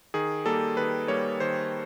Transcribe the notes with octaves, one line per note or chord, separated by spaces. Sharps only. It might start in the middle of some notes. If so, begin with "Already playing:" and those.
D#3 G#4
G3 A#3 A4
D#3 B4
G3 A#3 C#5
D#3 C5